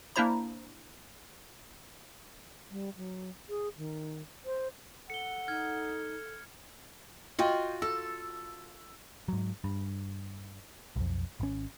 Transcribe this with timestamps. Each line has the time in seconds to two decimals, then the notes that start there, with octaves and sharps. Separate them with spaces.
0.16 A#3 D4 E4 C5 A#5
2.71 G3
2.97 F#3
3.49 G#4
3.78 D#3
4.46 C5
5.10 A4 F#5 C#7 G7
5.48 D#4 F6 G#6
7.39 F4 F#4 D#5 G5
7.82 A4 E6
9.28 G#2 F#3
9.64 G2
10.96 B1 F2
11.40 G#1 C#4